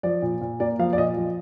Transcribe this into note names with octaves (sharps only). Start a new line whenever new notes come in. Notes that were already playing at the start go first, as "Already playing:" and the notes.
F3 D5
A#2
A#2
A#3 D5
F3 F5
D5
A#2 D#5
F3